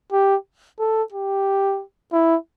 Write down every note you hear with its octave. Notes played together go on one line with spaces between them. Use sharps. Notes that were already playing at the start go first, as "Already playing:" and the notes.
G4
A4
G4
E4